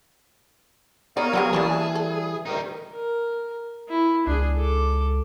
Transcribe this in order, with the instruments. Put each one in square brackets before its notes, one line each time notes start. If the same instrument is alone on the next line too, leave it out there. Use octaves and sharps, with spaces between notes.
[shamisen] B3 D5 [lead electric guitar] D#4 [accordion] A#4 C#5 F5
[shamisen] D3 B3 G4 [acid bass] F#3 [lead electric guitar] G#4
[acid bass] E3 [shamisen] G3 A#3 C#4 [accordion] A5
[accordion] G3 [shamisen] A4
[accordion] D2 D#3 [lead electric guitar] G3 D#4
[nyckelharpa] A#4
E4
[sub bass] C#2 [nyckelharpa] D4 G#4
[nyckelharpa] A4 D6